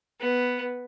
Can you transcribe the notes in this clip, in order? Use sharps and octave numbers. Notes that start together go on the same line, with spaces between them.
B3